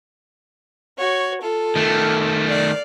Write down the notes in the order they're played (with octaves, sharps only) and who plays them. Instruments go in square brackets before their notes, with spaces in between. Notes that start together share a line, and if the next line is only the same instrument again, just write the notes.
[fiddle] F#4 C#5
F4 A4
[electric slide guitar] D#3 A3
[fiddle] D5 F5